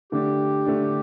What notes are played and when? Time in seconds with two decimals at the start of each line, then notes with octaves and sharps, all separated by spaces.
0.12 D3 A3 D4 G4
0.66 D3 A3 D4